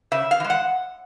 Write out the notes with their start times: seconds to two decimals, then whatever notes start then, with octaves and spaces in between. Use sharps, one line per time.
0.12 C#3 E5
0.31 F5
0.40 E3
0.44 G#3
0.50 F#5